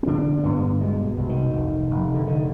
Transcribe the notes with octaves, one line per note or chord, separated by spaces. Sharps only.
C4
D3 D4
G2 B3
B2 G#3
C2
D#3
F1
F1
D3
D3 D#3